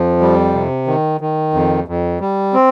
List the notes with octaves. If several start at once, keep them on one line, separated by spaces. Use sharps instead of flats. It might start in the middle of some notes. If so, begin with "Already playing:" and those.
Already playing: F2 F3
G3
C3
D#3
D#3
F2
F2
G3
C4